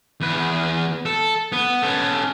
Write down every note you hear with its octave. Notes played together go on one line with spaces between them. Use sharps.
E2 B4
A4
B3
C#4 A4